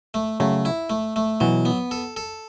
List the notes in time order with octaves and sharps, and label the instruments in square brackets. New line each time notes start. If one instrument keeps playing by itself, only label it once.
[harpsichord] A3
[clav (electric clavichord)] C#3 F#3 [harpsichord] A3
[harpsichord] E4
A3
A3
[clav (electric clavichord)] B2 E3 [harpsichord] F#3
[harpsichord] B3
A4
A4